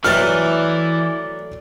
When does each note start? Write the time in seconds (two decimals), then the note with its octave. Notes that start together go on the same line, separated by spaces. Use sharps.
0.04 E3 F#3 A3 B4 D5 F6 A6